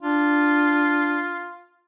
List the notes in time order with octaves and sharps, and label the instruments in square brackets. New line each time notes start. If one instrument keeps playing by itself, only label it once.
[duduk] D4 [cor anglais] F4